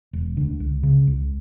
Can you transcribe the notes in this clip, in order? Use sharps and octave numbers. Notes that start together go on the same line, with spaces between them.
E1
D2 D3
C#2
C#3
C#2